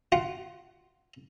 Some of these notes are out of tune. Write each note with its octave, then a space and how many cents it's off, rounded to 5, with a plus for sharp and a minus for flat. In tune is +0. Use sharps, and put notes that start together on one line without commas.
F4 +0 F#5 +20